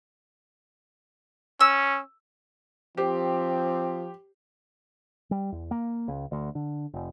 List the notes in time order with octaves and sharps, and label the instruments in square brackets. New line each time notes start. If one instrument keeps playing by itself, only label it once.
[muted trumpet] C#4 [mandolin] E6
[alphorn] F3 [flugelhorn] C4 [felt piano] G4 C5
[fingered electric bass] G3
E2
A#3
C#2
D2
D3
F1